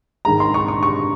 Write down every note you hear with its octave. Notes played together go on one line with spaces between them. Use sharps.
G#2 D#3 G#3 A#5
C6
C#6
C#6
C#6